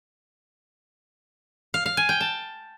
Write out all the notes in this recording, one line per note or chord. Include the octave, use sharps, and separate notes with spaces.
F5
F5
G#5
G5
A5